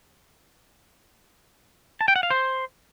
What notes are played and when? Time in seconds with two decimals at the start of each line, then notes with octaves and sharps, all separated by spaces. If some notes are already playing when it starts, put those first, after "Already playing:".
2.01 A5
2.08 G5
2.16 F#5
2.23 F5
2.31 C5